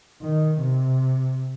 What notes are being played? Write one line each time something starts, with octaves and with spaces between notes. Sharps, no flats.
D#3
C3